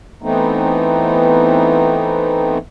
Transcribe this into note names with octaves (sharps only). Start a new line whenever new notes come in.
E3 A3 B3 C4 D#4